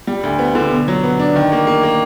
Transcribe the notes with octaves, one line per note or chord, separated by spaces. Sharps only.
G3
D2
B3
D3
B2
F#3
B3
D4
D#3
A#3
A#3
A#3